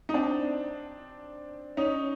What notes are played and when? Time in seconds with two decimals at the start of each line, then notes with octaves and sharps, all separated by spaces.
0.09 D#4
0.14 C4 D4
1.77 C#4 D#4